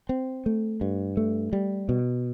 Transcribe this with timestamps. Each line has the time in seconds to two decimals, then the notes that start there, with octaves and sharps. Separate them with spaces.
0.09 C4
0.46 A3
0.81 G2
1.17 A3
1.53 G3
1.89 B2